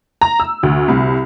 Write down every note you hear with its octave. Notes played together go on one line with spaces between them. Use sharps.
A#5
E6
D2
C2